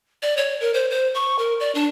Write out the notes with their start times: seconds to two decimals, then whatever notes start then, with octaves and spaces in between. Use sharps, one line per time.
0.23 D5
0.37 C#5
0.61 A#4
0.74 C5
0.91 C5
1.14 C#6
1.39 A#4
1.60 D5
1.75 D4